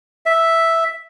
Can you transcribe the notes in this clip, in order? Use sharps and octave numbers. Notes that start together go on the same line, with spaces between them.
E5